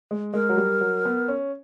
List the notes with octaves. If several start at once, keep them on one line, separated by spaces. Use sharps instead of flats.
G#3
G#3 A#4
F#3
G3
F#3
B3
C#4